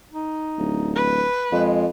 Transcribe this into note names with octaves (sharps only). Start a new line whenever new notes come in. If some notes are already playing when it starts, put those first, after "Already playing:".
D#4
D1
B4
F2 G#3